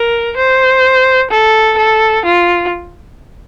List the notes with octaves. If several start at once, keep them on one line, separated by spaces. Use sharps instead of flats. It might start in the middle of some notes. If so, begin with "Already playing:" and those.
Already playing: A#4
C5
A4
A4
F4